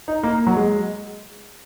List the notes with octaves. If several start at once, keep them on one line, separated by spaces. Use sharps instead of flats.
D#4
A#3
F#3
G#3